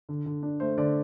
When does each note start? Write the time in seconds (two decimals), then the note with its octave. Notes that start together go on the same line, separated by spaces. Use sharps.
0.09 D3
0.26 D3
0.43 D4
0.60 A3 C5
0.78 D3 D5